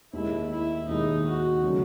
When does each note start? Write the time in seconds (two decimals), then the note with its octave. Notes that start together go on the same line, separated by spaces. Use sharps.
0.12 D#2 D#3 G#3 E4
0.50 E4
0.88 D#2 D#3 G#3 D#4
1.25 F#4
1.62 C#3 F#3 A3 C#4